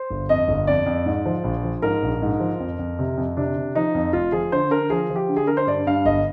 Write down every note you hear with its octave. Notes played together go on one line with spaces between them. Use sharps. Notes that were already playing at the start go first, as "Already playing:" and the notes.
Already playing: C5
G1
F2 D#5
G1
F2 D5
F2
G#2
F3
A#1
F3
G#2 A#4
A#1
G#2
F3
F2
F2
C3
F2
C3 D4
C3
F3 D#4
F2
F1 F4
F3 G#4
D3 C5
D3 A#4
F3 G#4
F3
G4
D3
G#4
D3 A#4
C5
G2 D5
G2 F5
G1 D#5